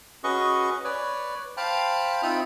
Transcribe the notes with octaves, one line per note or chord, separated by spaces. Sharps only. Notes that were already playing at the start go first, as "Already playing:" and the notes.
C#4 F#4 G#4 B4 D#5 C#6
B4 C#5 D5
C5 F5 G5 A5 B5
C4 D#4 F4 E5 B5 D#6